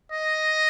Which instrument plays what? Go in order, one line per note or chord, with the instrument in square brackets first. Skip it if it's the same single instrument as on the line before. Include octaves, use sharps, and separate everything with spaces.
[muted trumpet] D#5